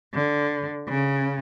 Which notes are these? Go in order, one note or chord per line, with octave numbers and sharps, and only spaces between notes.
D3
C#3